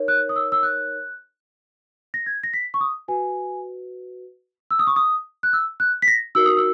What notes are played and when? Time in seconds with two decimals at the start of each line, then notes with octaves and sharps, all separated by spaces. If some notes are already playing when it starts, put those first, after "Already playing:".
Already playing: D#4 A#4 C#5
0.08 F#6
0.29 D#6
0.36 E6
0.52 E6
0.63 F#6
2.14 A#6
2.26 G#6
2.43 A#6
2.54 B6
2.74 C#6
2.81 D#6
3.08 F#4 B4 G#5
4.71 E6
4.79 D#6
4.87 C#6
4.96 D#6
5.43 F#6
5.53 E6
5.80 F#6
6.02 B6
6.08 A#6
6.35 D#4 F#4 A#4 E6
6.46 D#6
6.57 E6